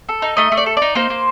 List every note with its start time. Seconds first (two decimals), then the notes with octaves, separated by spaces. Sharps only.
0.09 A4
0.22 D#4
0.37 A3 D#5
0.52 A3
0.57 D5
0.66 A4
0.77 D#4 D5
0.95 A#3 C5
1.10 A#3